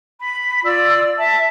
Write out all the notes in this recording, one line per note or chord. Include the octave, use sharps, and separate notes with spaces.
B5
F4 D5 E6
E5 A5